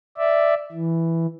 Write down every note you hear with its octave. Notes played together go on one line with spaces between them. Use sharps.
D5 E5
E3